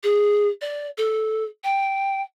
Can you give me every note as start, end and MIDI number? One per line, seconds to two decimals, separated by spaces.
0.03 0.47 68
0.61 0.87 74
0.97 1.44 69
1.64 2.21 79